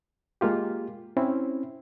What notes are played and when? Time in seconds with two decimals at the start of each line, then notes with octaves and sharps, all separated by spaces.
0.41 G#3 A#3 F4 G4
1.17 C4 C#4 E4